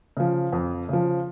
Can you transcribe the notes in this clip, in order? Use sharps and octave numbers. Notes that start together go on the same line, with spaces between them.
C#3 F3
F2
C#3 F3